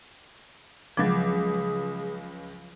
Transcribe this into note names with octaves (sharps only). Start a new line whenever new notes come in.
C#2 F3 F#3 G#4 D6